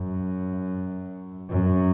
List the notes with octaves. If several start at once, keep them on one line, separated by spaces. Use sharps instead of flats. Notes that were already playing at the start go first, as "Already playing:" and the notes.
Already playing: F#2
F#2